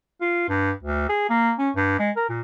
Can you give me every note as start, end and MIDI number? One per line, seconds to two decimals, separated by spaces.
0.21 0.46 65
0.49 0.72 43
0.83 1.07 38
1.09 1.27 68
1.30 1.52 58
1.58 1.70 61
1.76 1.97 43
1.99 2.11 56
2.16 2.26 70
2.29 2.42 46